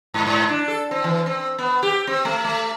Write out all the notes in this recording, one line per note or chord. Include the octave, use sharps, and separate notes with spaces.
G#2
G#2
D4
A4
C4
E3
C4
B3
G4
C4
A3
A3